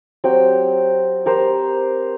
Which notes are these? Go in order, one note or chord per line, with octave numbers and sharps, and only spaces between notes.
F#3 C4 G4 G5
G4 A#4 C5